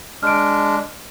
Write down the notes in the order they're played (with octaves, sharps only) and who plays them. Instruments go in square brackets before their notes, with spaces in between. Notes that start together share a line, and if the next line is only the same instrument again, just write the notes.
[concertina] G#3 D4 [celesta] F6 D7